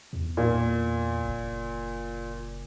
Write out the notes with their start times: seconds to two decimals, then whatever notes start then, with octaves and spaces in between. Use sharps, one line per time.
0.13 E2
0.37 A#2
1.25 F#1